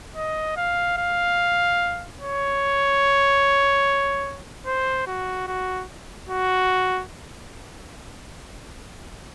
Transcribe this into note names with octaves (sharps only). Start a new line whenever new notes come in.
D#5
F5
F5
C#5
C5
F#4
F#4
F#4